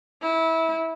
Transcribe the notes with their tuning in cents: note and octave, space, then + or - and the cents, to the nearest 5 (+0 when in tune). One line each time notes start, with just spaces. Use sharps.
E4 -20